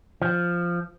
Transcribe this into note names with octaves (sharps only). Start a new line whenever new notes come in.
F3